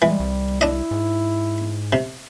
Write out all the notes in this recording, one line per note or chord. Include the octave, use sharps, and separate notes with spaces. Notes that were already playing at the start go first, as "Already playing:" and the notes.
E3 G3 G#3
C2
D4 E4 D#5
G#2
C3